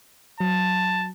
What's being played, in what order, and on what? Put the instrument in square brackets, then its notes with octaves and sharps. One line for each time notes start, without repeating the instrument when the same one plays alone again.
[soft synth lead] F#3 [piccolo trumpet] A5